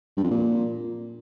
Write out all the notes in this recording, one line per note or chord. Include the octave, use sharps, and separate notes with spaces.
G2
F2
A#2